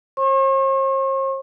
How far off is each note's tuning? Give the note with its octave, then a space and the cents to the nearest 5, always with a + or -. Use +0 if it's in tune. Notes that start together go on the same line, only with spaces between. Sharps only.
C5 +45 C#6 -45